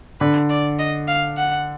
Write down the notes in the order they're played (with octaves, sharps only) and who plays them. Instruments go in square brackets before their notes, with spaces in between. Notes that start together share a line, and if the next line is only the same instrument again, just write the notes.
[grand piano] D3 [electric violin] B4
[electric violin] D5
D#5
F5
F#5